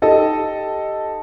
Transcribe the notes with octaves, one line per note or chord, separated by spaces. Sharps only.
D#4 G4 A4 D#5